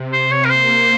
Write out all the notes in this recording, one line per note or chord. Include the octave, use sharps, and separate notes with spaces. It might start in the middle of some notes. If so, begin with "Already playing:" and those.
Already playing: C3
C5
C#5
A#4
A#3 C5